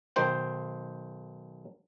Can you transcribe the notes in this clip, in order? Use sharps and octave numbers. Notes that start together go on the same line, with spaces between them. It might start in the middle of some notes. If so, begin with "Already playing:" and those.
B1 D#3 C5 G5